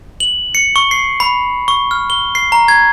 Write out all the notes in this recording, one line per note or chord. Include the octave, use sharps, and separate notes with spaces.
F#7
C#7
C#6
C7
B5
C#6
F6
G7
C7
A#5
G#6